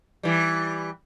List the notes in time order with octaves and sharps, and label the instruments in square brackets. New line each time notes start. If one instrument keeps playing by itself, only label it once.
[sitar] E3 G3